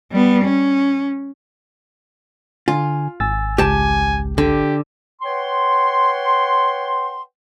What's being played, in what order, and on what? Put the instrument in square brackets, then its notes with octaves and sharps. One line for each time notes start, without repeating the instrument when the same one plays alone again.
[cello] G3 B3
C#4
[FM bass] D3 [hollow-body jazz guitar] F4 [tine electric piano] G#5
[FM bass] G#1 [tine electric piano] G#5 E6 A6
[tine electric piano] C#2 [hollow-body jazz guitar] G4 A5 [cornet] G#5
[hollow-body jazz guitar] D3 [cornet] G4
[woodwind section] B4 C#5 F#5 G5 C6